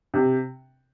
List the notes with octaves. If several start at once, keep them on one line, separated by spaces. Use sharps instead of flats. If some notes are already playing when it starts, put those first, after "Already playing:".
C3